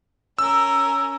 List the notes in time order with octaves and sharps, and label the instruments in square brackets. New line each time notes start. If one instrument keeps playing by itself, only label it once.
[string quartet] C#4 A#4 [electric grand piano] E6